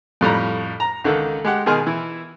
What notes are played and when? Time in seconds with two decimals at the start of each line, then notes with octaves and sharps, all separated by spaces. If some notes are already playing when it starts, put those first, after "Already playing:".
0.21 F2 A2 G3 A#5
0.80 A#5
1.04 C#2 D3 D#3 A4
1.45 G#3 G4 F#5
1.66 B2 D#3 G#4 C6 F6
1.87 E3 E4